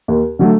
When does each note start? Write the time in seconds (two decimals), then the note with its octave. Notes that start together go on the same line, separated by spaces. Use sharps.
0.08 D#2
0.39 D3 F#3 A3